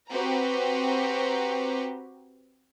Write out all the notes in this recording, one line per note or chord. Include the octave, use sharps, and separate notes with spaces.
C4 F#4 G4 B4 A#5